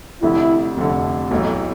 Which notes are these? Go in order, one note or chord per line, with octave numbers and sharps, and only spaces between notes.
F1 F2 D3 E4
F1 F2 D3
B1 A2 E3 D#4